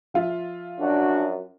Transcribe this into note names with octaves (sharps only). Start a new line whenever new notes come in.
F3 F4 E5
F#2 D4 F#4